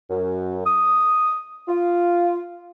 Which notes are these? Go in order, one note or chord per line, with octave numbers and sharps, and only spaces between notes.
F#2
D#6
F4